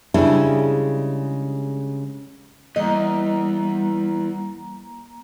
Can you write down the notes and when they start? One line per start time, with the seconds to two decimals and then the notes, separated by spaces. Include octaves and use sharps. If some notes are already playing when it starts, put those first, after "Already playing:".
0.14 C#3 G3 G#3 D4 E4
2.76 E2 G3 A#3 D#5 A#5